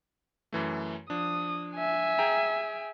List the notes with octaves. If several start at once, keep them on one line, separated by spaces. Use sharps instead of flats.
F#2 E3 A3
F3 D4 D#6
E5 G#5
G#4 G5 A#5